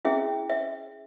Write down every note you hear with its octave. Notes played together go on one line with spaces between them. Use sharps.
C#4 E4 G#4 E5
E5